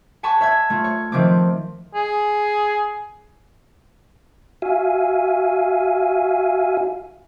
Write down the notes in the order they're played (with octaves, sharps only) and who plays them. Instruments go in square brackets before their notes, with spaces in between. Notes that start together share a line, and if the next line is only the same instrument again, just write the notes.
[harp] F#5 G#5 A5 B5 C#6
C#5 E5 A5 G#6
A3 F4
C#5
D#3 F3 A3 C4 D6
[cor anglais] G#4
[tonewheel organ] F#4 E5 F5 G#5